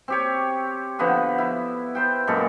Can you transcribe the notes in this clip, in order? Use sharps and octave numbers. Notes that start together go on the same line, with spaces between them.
C4 G4 C#5
D3 F3 B3 B4
E4
B4 C5 G5
F#2 A#2 G#3 A4